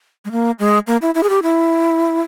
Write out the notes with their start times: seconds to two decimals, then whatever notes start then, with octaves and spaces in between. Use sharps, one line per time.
0.25 G#3
0.31 A#3
0.59 G#3
0.87 A#3
1.02 E4
1.15 E4
1.23 G#4
1.30 G4
1.43 E4